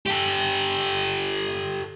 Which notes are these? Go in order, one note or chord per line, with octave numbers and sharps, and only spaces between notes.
G4 A4